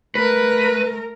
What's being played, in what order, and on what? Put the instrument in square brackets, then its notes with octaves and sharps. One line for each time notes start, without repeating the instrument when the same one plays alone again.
[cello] A3 A#4 [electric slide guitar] B4